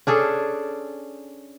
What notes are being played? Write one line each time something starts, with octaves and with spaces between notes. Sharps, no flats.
C#4 D4 G#4 A4